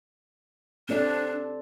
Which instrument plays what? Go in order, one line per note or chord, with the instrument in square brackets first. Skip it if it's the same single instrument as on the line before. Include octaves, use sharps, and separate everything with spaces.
[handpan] C4 A4 D5 [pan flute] D4